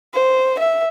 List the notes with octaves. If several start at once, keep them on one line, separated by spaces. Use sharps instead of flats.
C5
E5